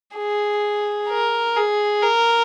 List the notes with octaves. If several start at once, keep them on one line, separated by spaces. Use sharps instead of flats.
G#4
A#4
G#4
A#4